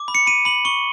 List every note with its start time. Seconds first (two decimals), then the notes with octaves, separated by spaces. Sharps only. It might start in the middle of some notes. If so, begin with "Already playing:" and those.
Already playing: D6
0.08 B5
0.15 C#7
0.26 B5 D#7
0.45 B5 F#7
0.65 C#6 G7